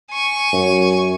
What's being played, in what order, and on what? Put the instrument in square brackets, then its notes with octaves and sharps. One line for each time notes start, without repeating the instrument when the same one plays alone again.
[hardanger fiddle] G#5 C#6
[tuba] F#2